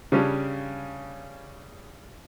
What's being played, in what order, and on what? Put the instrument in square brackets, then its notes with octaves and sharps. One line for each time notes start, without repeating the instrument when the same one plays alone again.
[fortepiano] C#3 G3 C#4 D4